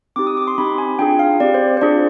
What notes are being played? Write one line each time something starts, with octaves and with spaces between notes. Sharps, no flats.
C4 D#4 G4 D6
D#6
D6
C6
C4 D#4 G4 B5
G#5
D4 F4 G#4 G5
F5
C4 G4 D5
C5
C5
D4 F4 G#4 D5